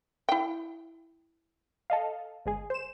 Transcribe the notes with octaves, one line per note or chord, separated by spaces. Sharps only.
E4 G5
A4 D#5 F5
G1 G#3 G#4
C5 E7